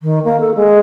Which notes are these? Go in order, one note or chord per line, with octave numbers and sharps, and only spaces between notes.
D#3
A#3
A4
G#3